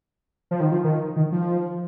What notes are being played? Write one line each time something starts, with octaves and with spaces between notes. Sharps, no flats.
F3
D#3
F3
D#3
D#3
F3